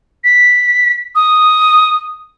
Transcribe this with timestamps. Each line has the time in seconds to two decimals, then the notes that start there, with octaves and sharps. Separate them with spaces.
0.24 B6
1.15 D#6